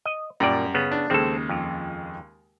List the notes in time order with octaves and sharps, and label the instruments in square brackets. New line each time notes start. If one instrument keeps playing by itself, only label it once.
[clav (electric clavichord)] D#5
[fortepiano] F#2 G3 [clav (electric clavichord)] A#2 D5
[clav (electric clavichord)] C#3 B3
[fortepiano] D4
[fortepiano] D#2 C#3 G#3 [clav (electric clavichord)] C4 A4
[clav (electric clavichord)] F2